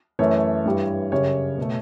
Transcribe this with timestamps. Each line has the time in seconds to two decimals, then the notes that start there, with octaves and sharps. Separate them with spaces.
0.19 F#2 E3 A3 C#5
0.65 G2 E3 G3
1.12 F#2 C#3 G3 C#5
1.58 B2 A3